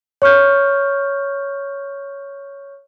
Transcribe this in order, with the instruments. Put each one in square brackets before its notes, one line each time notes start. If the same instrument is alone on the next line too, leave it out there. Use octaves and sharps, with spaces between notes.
[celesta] C#5 C#6 F6 G6